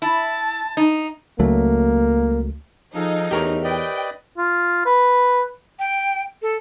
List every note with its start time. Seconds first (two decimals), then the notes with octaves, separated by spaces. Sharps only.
0.02 E4 A5
0.77 D#4
1.39 C#2 F#3 A3 A#3
2.95 F3 D#4 G#4 A4 F5
3.31 E2 A3 G4 A#4 C#5
3.64 B4 D5 D#5 G5
4.38 F4
4.86 B4
5.79 G5
6.42 A4